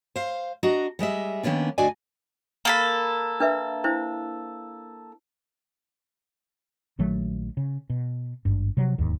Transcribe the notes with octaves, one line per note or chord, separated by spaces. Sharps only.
C5 F5
D4 F#4 D#5 A#5
G3 G#3 D#5 E5
D#3 A#3 B3 C#4 D4
D2 D4 F#4 D5 D#5 G#5
A#3 A4 B5
D4 B4 E5
D4 E4 C5
A#1 D#3 F#3 A3
C#3
B2
G#1 G2
C3 F3 F#3
D1 D#2 G#2 D#3